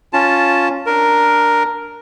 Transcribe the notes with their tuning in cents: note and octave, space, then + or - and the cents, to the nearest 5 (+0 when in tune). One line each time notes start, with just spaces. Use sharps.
C#4 +0 F4 +0 A5 +0
D4 +0 A#4 +0